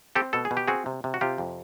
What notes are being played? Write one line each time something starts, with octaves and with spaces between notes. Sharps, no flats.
C4 G4 A4
B2 A4
G#4
B2
G4
C4 F#4 G#4
C3
C3
F#4
C3 F4 G4
F2